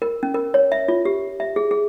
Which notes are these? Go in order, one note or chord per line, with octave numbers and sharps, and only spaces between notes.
A#4
C#4
A#4
C#5
E5
F4
G4
E5
G#4
G#4